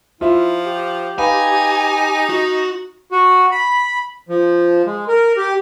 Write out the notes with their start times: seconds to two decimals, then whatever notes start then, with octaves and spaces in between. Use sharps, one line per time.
0.21 F3 E4 F4 E5
0.66 G4
1.18 D#4 B4 F5 G#5 B5
2.30 F#4
3.12 F#4
3.52 B5
4.29 F3
4.86 G#3
5.08 A#4
5.37 G4